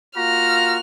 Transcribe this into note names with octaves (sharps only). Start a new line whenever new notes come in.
A#3 F4 F#4 A#5 F6